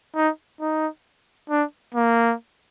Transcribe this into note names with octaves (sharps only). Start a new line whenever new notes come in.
D#4
D#4
D4
A#3